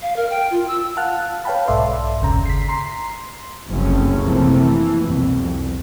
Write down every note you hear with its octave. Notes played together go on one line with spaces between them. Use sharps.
F5
A#4
G5
F4
E6
F5 F#5 A5 F6 F#6
B4 C#5 F5 G5 A5 B5
B1 G#2 A4 D5 E5 C6
G1 D#2 C#3 A#5
B6 C7
A#5 C6 C7
F#1 C2 F2 C#3 A3 C#4
C3 E3 F3 A3 A#3
E3
C2 F2 B2